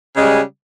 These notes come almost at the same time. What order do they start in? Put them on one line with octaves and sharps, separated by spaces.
C#3 G#3 G3